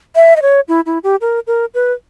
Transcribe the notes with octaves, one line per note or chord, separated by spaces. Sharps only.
E5
D#5
C#5
E4
E4
G4
A#4
A#4
B4